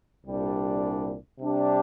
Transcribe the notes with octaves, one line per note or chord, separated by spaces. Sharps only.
C2 A#2 G3 D4
C3 G3 D4 G4